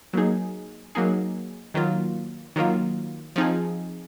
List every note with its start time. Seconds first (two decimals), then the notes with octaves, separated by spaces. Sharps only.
0.13 F#3 A#3 D#4 G#4
0.95 F#3 A#3 D#4 G#4
1.74 D#3 F#3 A#3 F4
2.56 D#3 F#3 A#3 F4
3.36 F3 C4 D#4 G#4